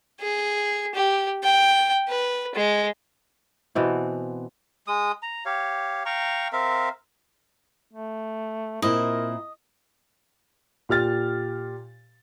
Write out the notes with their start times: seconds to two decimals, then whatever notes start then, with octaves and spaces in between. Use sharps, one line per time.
0.21 G#4
0.95 G4
1.43 G5
2.08 B4
2.55 G#3
3.75 B2 E3 B3 C4
4.87 G#3 D#6
5.22 A#5
5.46 G4 C#5 F5
6.06 F5 G5 A#5 C#6
6.53 C4 A#4 E5 F5
7.93 A3
8.82 A#2 C4 E4 A#4 D#5
10.89 A#2 G4 F6 A6